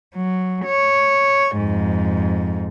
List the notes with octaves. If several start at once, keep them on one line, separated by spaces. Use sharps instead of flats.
F#3
C#5
F2 G#2